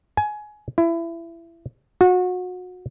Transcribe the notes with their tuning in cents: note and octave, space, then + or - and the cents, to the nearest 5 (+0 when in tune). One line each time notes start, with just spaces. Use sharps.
G#5 +20
E4 +25
F#4 -30